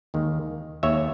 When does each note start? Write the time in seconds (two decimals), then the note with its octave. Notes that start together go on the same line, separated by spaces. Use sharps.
0.14 D#2 D#3 G#3
0.83 D#2 D#3 G#3 C#5 E5